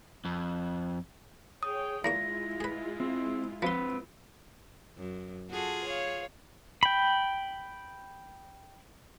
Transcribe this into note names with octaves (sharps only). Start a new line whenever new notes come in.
F2
G#4 C#5 G5 D#6
E2 G#3 A#3 E4 F4 C#6 A#6
G#4 B4
C4
F3 C4 B4 C6
F#2
F4 F#4 G#4 A4
C#5 F5
G5 B5